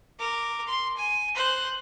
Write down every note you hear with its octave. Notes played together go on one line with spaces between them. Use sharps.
A#4 D6
C6
G#5
C5 F#6